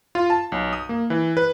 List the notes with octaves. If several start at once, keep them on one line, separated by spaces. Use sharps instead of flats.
F4
A5
B1
D#6
A#3
E3
B4